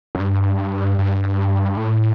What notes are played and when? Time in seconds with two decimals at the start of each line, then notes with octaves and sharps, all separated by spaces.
0.15 F#2
0.20 G2
0.99 G2
1.77 A2